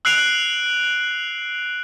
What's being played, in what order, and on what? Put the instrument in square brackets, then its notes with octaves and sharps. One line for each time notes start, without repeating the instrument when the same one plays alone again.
[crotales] E6 F#6 C7 D7 F7